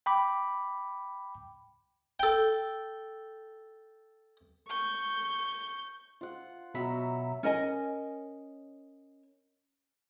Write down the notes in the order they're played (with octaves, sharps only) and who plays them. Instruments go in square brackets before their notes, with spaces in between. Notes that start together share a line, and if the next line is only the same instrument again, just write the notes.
[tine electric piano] G5 B5 D6
[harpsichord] A4 G5
[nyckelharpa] C#6 [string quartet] G6
[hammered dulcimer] F4 F#5
[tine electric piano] B2 B5 B6 [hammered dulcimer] F#3 E5 A#5
[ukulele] C#4 A#4 D#5 G#5